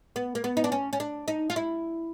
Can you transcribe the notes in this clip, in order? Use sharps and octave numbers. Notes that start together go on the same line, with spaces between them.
B3
A#3
B3
D#4
D4
C#4
C#4
D4
D#4
F4
E4